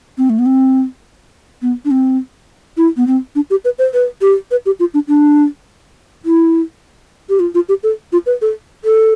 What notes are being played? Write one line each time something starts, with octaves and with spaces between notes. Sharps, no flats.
C4
A3
B3
C4
B3
D4
C4
E4
B3
C4
D4
G4
B4
C5
B4
G4
B4
G4
F4
D4
D4
E4
G4
F4
F4
G4
A4
F4
B4
A4
A4